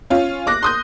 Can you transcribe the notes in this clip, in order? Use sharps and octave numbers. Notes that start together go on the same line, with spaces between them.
C#4 F4
D6 F#6 A#6
C6 D#6 G6